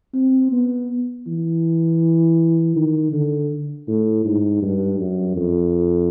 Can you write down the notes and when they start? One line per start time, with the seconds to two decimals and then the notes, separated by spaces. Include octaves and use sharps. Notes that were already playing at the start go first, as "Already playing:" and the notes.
0.14 C4
0.52 B3
1.27 E3
2.76 D#3
3.12 D3
3.88 A2
4.25 G#2
4.62 G2
4.99 F#2
5.36 F2